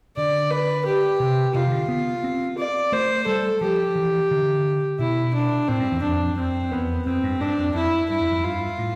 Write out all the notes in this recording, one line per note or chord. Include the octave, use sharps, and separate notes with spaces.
D3 D5
B4
G4
C3
C3 F4
E3
D3
B3
C4
D5
A3 C5
G3 A4
F3 G4
E3
D3
B2 E4
D4
A2 C4
G2
E2
F2 D4
F2 C4
E2 B3
F2 C4
G2
G2 D4
F2
F2 E4
G2 E4
F2
F2
G2 F4
A2